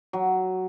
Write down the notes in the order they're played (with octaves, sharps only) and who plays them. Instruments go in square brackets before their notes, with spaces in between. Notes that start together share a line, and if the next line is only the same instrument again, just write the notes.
[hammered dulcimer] F#3